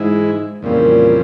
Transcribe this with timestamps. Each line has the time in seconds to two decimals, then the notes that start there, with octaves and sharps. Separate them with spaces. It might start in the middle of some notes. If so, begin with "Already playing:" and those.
Already playing: G#2 E3 G#3 E4
0.62 F2 A#2 C#3 E3 G3 C4